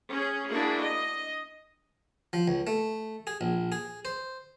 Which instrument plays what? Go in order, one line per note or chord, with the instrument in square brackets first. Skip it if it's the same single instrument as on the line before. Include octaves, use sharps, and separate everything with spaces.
[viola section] C#4 G#4
A#3 D4 E4 F#4 G#4
D#5
[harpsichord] F3
C#2
A3
G#4
A#1
G#4
C5